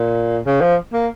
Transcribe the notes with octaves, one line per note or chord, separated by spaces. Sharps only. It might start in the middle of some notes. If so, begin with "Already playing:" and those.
Already playing: A#2
C#3
F3
A#3